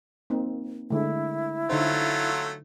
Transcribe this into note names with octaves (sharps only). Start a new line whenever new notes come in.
A#3 C4 D#4
D3 G#3 A3 E4
D3 F#3 A3 D#4 F4 C5